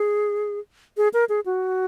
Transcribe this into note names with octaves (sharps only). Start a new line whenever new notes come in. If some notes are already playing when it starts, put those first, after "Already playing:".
Already playing: G#4
G#4
A#4
G#4
F#4